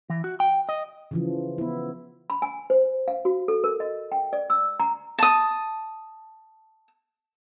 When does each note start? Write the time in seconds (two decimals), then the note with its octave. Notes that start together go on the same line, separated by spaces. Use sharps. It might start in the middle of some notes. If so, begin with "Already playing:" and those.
0.10 E3
0.24 F#4
0.40 G5
0.69 D#5
1.11 C#3 E3 F3
1.58 B3 E4
2.30 B5
2.42 G#5
2.70 C5
3.08 F5
3.25 F#4
3.48 A4
3.64 A#4
3.80 D#5
4.12 G5
4.33 D5
4.50 E6
4.80 A#5
5.19 A5 D#6